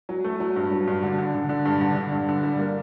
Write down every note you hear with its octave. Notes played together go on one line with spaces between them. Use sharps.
F#3
A3
F#3
G2
F#3
G2
D3
D3
D3
D3
G2
D3
D3
G2
D3
G3
A#3